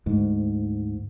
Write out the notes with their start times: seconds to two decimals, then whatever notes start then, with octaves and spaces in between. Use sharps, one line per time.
0.06 D2 G#2